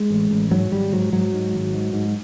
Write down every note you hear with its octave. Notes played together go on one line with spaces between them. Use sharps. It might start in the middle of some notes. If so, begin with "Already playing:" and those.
Already playing: G#3
A1
A1
G#2 F#3
G#1 G3
G#2 F#3
G#2 F#3
G#2
G#1
G#2
G#2